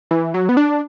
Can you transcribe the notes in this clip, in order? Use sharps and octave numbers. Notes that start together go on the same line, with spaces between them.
E3
F#3
B3
D4